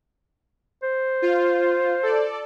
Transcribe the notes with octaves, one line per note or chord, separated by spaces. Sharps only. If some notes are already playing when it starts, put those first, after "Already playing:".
C5
F4
A4 D5